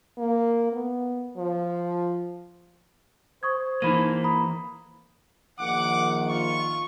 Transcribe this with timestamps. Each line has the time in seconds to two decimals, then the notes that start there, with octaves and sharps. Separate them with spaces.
0.18 A#3
0.72 B3
1.37 F3
3.43 C5 C#6 D#6 G#6
3.82 E3 A#3 D#4 B5 D#7
4.24 A#5 B5 D#6
5.60 A#1 D#3 F#5 D6
6.29 F4 C#6